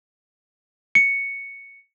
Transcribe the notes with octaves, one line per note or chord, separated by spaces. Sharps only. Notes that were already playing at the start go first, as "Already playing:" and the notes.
C#7